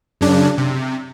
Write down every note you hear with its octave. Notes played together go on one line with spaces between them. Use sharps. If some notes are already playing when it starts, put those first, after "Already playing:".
F#2 C#3 D4
C3